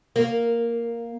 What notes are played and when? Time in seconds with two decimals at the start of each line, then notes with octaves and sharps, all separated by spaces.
0.16 A#3